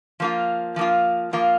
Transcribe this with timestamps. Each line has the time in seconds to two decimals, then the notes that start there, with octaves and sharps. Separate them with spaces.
0.20 F3 A#3 F4
0.76 F3 A#3 F4
1.33 F3 A#3 F4